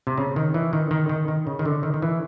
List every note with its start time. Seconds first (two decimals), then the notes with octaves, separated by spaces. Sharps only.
0.07 C3
0.18 C#3
0.36 D#3
0.54 E3
0.73 D#3
0.91 D#3
1.09 D#3
1.28 D#3
1.47 C#3
1.59 D#3
1.66 D3
1.83 D#3
1.94 D#3
2.02 E3